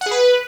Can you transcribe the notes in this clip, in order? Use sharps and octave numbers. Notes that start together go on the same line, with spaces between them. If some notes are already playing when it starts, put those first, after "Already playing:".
F#5
G#4
B4